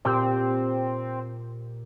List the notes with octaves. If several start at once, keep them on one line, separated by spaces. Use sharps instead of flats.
A#2 C4 G4